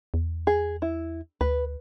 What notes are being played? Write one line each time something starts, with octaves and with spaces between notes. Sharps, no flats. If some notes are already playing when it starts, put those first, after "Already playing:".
E2
G#4
E4
D2 B4